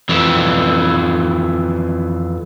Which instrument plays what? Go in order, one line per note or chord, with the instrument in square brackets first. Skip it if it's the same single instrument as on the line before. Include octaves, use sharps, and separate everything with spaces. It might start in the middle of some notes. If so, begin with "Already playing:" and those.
[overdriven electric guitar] F2 E3